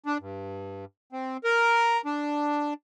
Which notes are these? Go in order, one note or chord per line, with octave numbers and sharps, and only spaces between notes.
D4
G2
C4
A#4
D4